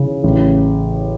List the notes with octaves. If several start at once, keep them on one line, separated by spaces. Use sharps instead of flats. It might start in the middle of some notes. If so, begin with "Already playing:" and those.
Already playing: C#3 E3
A1